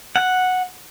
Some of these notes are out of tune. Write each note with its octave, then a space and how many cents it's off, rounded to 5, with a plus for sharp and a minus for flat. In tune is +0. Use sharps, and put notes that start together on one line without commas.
F#5 -5